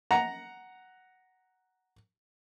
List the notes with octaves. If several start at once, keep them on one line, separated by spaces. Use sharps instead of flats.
F#5 A#5